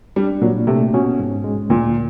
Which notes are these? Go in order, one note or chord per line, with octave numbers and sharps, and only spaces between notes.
G3 D4
A#2 F#3
C3 A3
B2 C#4
G#2
G#3
D2 A#2